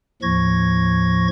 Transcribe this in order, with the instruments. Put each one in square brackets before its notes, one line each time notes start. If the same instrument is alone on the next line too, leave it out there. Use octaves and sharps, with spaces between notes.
[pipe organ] D#2 A2 F3 C#6 G#6 A#6